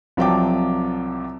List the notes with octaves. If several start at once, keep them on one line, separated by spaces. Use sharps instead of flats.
C2 F3 F#3 G5 A5 D6